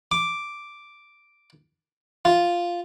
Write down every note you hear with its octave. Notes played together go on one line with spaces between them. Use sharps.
D6
F4